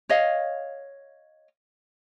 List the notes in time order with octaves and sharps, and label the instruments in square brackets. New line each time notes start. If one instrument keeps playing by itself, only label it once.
[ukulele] C#5 D#5 F5